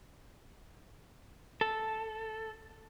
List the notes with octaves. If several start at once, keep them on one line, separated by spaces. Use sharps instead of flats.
A4